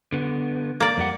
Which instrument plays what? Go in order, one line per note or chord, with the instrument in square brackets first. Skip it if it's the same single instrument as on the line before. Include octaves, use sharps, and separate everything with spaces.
[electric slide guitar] D3 B3
[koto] A#3 D5
[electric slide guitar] F2 G3 F#5